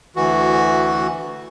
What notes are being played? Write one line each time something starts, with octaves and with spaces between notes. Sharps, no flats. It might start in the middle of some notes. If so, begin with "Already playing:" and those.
D2 E3 F#4